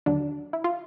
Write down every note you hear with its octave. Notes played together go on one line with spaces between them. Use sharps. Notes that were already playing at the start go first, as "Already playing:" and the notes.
D#2 D3 F#3 D4
E4
F4